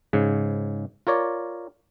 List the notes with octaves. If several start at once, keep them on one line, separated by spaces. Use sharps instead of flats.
G#2 C#3
F4 A#4 C#5 D5